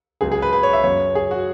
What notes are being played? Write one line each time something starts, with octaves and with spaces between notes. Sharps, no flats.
C#2 C#3 F#3 G#4
G#4
B4
B4
C#5
E5
F#2 F#3 C#5
G#4
F#4